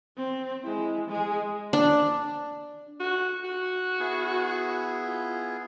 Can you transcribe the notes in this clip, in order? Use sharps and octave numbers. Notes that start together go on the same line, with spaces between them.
C4
G#3 E4
G#3 G#4
D4
F#4
F#4
B3 E4 G#4
F4